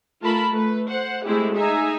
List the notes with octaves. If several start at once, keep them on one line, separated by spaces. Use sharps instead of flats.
A3 F4 A#4 A5 B5
A3 B4
C5 F#5
G#3 A3 C4 E4 G4 G#4
D#4 G#4 E5 G#5 A#5